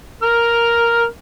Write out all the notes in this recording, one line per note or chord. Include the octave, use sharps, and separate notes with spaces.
A#4 F6